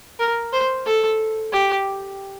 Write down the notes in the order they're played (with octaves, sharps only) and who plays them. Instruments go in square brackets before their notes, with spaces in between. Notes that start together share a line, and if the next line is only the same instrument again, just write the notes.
[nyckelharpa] A#4
C5
A4
G4